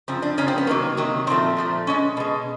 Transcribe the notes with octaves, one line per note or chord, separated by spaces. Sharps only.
F#2 C#3 F3 C4
D4
F#2 C#3 F3 C#4
C4
B3
C3 D#3 F#3 A#3
C3 D#3 F#3
A#2 F3 A3 C4
A#2 F3 A3
B2 G#3 C#4
B2 G#3